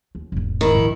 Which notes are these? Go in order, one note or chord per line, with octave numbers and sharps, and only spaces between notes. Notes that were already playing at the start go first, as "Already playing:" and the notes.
D#2
E1 G#2
D#3 E4
A#1 D#2